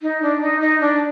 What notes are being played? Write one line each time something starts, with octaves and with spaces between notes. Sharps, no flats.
D#4
D4
D#4
D#4
D4